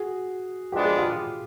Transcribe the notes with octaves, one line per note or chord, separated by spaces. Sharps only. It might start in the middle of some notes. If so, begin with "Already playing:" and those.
Already playing: F#4 G#4
F3 G#3 B3 D4 G4
G#4
F4 G4